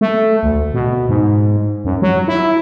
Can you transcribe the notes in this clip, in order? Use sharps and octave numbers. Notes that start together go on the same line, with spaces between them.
A3
D2
B2
G#2
F#2
F#3
E4